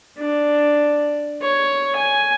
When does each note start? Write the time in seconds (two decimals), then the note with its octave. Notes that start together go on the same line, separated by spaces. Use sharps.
0.18 D4
1.42 C#5
1.96 G#5